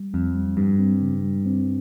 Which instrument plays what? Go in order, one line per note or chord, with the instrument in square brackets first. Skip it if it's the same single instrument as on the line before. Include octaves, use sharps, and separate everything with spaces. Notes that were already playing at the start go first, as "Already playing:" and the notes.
Already playing: [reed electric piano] G3
[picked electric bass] F2 [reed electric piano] C4
[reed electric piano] G3
[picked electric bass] G2 [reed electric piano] G3
[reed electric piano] C4
C#3
G3
C4